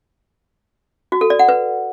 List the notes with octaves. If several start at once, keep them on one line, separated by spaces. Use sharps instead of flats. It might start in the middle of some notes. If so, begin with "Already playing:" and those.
F#4
A4
D5
F#5
B4